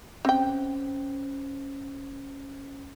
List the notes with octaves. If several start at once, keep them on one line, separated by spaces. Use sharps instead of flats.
C4 C#4 C5 G5